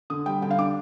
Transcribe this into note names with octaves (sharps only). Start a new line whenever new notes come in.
D3 D#6
G3 G5
D3 G5
F5
D4 D6